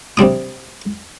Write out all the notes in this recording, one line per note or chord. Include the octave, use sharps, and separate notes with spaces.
C3 G3 D4 D#6